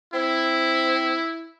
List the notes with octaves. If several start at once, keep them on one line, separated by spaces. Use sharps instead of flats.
C4 E4